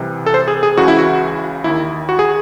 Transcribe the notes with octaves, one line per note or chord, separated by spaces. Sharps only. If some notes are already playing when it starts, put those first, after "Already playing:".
Already playing: C2 C3 E3
A4
C5
G#4
G#4
C#2 C#3 E3 F#4
E4
F#4
D#2 D#3 E4
F#4
G#4